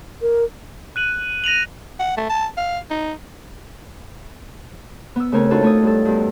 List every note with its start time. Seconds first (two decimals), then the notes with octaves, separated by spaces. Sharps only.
0.22 A#4
0.96 F#6 D#7 F#7
1.44 A#6 D#7 F7 F#7
2.00 F#5
2.17 A3
2.30 A5
2.57 F5
2.91 D#4
5.16 B3 E6
5.32 C#3 A3 C4 A#4 C#5
5.51 D4 D#4 F4 F#4 A4
5.62 A3 C#5 D#6
5.83 G2 A4
6.05 E2 G2